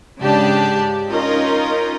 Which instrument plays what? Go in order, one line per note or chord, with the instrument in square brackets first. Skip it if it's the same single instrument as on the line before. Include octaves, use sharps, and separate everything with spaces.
[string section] G#2 C#3 D4 G4 D5 A5
C#4 D#4 F4 A#4 D#5